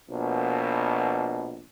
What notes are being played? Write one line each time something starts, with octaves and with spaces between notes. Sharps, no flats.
A#1 B2